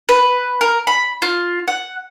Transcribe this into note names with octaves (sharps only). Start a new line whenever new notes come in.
B4
A#4
B5
F4
F#5